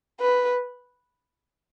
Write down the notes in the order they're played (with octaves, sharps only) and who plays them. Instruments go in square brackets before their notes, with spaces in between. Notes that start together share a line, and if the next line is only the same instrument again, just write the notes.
[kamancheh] B4